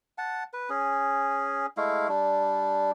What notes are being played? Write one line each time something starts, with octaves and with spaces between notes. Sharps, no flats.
F#5 A5
B4
C#4 G#4
G#3 A3 E4 F5
G3 D4